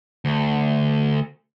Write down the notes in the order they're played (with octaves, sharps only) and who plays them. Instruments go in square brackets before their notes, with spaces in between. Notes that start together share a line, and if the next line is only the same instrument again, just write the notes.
[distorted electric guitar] D2